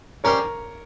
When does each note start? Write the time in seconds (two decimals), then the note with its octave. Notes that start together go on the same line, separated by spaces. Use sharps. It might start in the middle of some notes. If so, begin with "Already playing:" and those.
0.24 G3 C#4 G4 A#4 C5 C#5